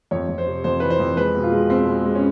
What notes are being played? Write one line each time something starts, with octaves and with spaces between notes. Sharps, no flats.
F2 C#5
F2
C5
C3
F2 C5
E3 B4
C5
F2
G#3 B4
B2
F4
G#3
B2 C4
G#3
G#3
C#4